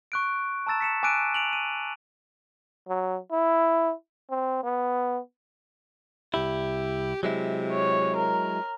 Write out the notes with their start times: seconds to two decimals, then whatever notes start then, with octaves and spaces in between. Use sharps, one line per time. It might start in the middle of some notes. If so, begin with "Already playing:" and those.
0.12 C#6 F#6 D7
0.67 A5 A#5 E6 A6 E7
0.80 B6 C#7 E7
1.03 G#5 D6 E6 F#6 D7 D#7
1.34 D7 F7 F#7
1.53 D#7
2.88 F#3
3.32 E4
4.30 C4
4.63 B3
6.34 C2 E4 G4
7.23 C3 F#3 G#3 E4
7.72 C#5
8.17 A#4